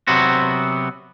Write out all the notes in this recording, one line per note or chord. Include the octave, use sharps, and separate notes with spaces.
C3 F#3 B3 C4 F#4